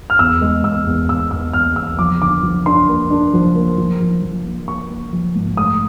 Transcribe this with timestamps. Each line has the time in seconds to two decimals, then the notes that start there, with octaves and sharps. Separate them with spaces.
0.10 F6
0.19 E2 E6
0.41 G#3
0.64 E2 E6
0.87 E2
1.09 E2 E6
1.31 E2 E6
1.53 E2 F6
1.76 E2 E6
1.99 F3 D6
2.21 D3 D6
2.43 F3
2.66 D4 C6
2.88 A#3
3.10 D4
3.33 F3
3.55 A#3
3.78 F3
4.00 F3
4.22 F3
4.45 A#3
4.68 A#3 C#6
4.90 A#3
5.13 F3
5.35 G#2
5.57 A3 D#6